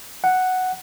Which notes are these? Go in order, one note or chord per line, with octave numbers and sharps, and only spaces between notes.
F#5